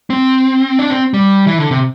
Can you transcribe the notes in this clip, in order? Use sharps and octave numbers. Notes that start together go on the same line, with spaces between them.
C4
D4
C4
G3
E3
D3
C3